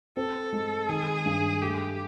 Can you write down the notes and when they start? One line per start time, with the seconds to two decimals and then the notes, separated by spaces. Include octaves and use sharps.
0.17 C4 A4
0.53 G#3
0.89 D#3 G#4
1.25 G2
1.61 A3 G4